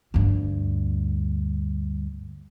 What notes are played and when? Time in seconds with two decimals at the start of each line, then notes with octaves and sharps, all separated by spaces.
0.14 D2 G2